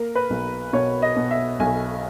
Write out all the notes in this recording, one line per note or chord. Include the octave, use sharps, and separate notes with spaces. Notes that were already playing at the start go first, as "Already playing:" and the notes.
Already playing: A#3 A#4
B4
B1
B2 C#5
D#5
B2
E5
B1 G#5